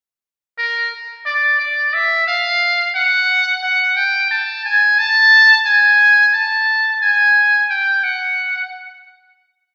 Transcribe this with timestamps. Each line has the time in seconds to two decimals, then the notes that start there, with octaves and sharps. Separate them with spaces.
0.58 A#4
1.26 D5
1.59 D5
1.93 E5
2.28 F5
2.95 F#5
3.63 F#5
3.96 G5
4.31 A5
4.65 G#5
4.99 A5
5.66 G#5
6.34 A5
7.02 G#5
7.70 G5
8.03 F#5